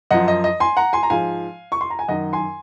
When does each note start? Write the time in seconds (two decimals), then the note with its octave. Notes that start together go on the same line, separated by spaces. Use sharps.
0.11 F#2 F3 D#5 F#5
0.28 D#5
0.44 D#5
0.60 G#5 C6
0.77 F#5 A#5
0.93 G#5 C6
1.03 A#5
1.10 G#2 F3 F5 G#5
1.72 C#6
1.81 C6
1.90 A#5
1.99 G#5
2.08 F#2 D#3 D#5 F#5
2.33 G#5 C6